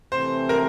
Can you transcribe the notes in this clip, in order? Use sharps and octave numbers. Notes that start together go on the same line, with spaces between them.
C3 E3 A3 C4 C5
A#4